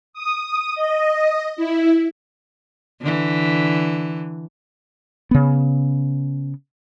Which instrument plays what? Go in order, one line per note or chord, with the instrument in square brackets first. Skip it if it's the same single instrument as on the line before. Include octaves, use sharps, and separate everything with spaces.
[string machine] D#6
D#5
E4
[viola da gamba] D3 E3
[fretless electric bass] C#3 B3